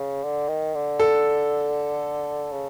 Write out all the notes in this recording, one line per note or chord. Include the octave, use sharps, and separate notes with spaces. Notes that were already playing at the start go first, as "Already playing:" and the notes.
Already playing: C#3
D3
D#3
D3
A4
C#3